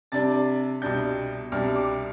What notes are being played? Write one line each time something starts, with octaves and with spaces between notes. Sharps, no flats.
C3 G3 D4 A6
C2 B2 G3 D4 G6
C2 B2 G3 D4 F6
D6